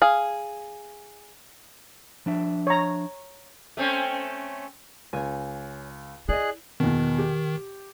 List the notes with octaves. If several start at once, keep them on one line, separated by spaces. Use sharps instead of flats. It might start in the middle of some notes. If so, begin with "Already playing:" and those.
G#4 F5
F3 D4 E5
C#5 A#5
A3 C4 C#4
C#2 C#5 G#5
E4 G#4 D5 D#5 F#6
E2 B2 D#3
G4